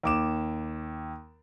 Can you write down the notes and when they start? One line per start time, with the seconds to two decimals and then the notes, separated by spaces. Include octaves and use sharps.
0.03 D#2 D6 E7